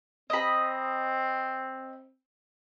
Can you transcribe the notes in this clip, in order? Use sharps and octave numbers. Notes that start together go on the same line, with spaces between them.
C4 D#5 B5